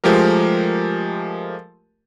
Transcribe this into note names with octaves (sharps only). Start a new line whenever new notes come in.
F3 G#3 A3 G4 A#4